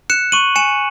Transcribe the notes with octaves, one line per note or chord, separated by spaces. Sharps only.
F#6 C#7 E7
C#6 D#7 F#7
G#5 C#7 E7